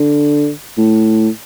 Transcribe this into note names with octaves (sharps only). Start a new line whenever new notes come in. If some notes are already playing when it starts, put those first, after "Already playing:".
Already playing: D3
A2